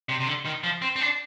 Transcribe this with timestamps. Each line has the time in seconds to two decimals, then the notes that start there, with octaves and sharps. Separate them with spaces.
0.09 C3
0.20 C3
0.26 D3
0.46 D#3
0.64 F3
0.82 C4
0.96 C4
1.01 D4